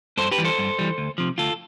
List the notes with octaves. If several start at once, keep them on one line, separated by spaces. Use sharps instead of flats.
G2 A4 C5
G4 B4
E3 G3
A4 C5
G2
E3 G3
D2
C3 F3
D2 F4 A4